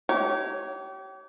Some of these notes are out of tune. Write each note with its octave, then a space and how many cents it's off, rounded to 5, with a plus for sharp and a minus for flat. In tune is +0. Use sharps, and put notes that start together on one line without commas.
G4 -35 C#5 +0